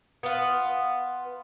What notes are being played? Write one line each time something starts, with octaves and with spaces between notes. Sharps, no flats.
B3 F4